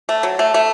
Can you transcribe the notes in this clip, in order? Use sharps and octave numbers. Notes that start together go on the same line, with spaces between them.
A3
F#3
A3
A3